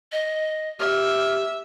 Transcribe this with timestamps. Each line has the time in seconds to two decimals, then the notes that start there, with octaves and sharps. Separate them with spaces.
0.12 D#5
0.80 G4 E5 F6